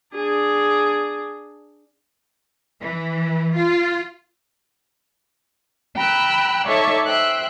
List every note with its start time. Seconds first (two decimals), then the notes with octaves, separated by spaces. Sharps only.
0.15 D4 G#4
2.80 E3
3.55 F4
5.96 G5 A#5 B5 E6 F#6
6.66 D#4 A4 C#5 D5 E5 C#6
7.06 C5 E5 G5 F#6